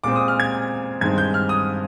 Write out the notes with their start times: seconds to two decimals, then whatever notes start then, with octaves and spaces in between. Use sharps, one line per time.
0.04 A#2 G#3 C4 D6
0.16 D#6
0.28 F6
0.40 G#6
1.01 G2 D#3 G#3 C4 G#6
1.18 G6
1.34 F6
1.49 D#6